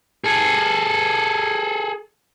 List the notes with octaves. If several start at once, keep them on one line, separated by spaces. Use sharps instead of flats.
G#4 A4